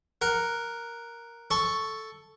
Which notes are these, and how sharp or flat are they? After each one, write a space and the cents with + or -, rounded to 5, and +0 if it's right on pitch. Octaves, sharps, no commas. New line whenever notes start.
A#4 +0 F#5 +0
A4 +0 C#6 +0